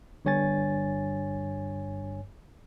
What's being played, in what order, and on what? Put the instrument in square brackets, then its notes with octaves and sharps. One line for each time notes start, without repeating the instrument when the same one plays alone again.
[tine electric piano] G1 G2 C#5 G#5 A6